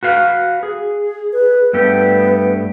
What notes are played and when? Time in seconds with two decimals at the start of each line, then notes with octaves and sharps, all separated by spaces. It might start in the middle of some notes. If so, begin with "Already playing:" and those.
0.03 F#4 B4 F5
0.63 G#4
1.33 B4
1.73 G2 A3 B3 G4